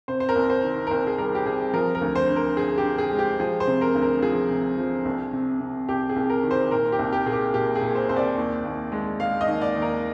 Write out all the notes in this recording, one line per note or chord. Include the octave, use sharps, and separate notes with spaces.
C3 C5
C5
A#4
C2
C5
D#3
A#4
C2 C5
G#4
G3 A#4
G4
C3 G#4
F3 A#4
A#4
D2
C5
D3
A#4
D3 G#4
G4
D3
G#4
G#3
G4
F3 G#4
C5
C3
A#4
D2
A#4
F3 G#4
C3
F3
C2
C3
C3
C2 G4
G#4
C2
A#4
D#3
C5
A#2 A#4
G4
C2
G4
A#2 G#4
G4
A#2 G4
G#4
A#2
C5
C2 C5
D5
D#2
D#2
G#3
G#3 F5
D#5
D#2
D5
D#2
A#4